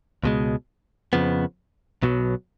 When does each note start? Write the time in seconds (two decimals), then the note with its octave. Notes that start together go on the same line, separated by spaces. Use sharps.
0.24 C#2 B2 G#3
1.13 F2 C#3 F3 B3
2.03 B1 B2 F#3